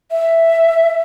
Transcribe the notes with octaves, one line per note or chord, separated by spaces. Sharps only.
E5